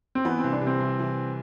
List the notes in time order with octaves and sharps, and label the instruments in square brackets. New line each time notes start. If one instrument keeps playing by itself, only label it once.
[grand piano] C4
[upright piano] E3 [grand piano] B3
[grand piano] C4
[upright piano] C2
[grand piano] D4
[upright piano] C3
[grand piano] C4
[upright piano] C2
E3